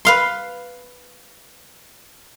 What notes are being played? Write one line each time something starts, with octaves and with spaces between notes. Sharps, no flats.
B4 F5 C6